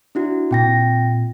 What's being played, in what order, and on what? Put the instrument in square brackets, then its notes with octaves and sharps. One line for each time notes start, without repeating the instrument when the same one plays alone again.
[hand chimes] D4 E4 F#4
[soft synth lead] A#2 [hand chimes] C4 G5 A#6